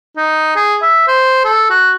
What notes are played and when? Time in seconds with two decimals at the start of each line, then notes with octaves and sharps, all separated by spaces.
0.17 D#4
0.56 G#4
0.82 E5
1.08 C5
1.44 A4
1.70 F#4